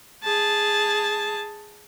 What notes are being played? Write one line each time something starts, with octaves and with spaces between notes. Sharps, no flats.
G#4 A5